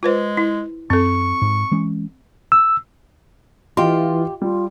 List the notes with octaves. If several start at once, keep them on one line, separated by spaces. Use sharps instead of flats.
G#3 F4 B4 C5
E4
F#2 C4 A4 C#6
G#2
E3 G#3 C#4
E6
E3 F4 G4 D#5 C6
G3 F4